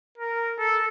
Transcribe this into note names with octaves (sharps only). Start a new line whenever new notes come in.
A#4
A4